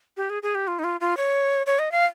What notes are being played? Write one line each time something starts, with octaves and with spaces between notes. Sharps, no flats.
G4
G#4
G#4
G4
F4
D#4
F4
F4
C#5
C#5
D#5
F5